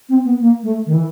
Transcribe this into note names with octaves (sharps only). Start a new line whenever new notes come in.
C4
B3
A#3
A3
D#3
E3